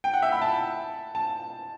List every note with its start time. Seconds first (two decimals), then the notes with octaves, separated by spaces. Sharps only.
0.04 G5
0.14 F#5
0.22 E5
0.32 B5
0.42 A5
1.15 A5